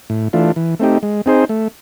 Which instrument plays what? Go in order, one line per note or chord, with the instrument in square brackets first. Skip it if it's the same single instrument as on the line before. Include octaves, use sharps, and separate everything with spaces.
[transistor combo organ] A2
E3 A3 D4 F4
E3
A3 C4 D#4 G4
G#3
C4 D#4 G#4 C5
A3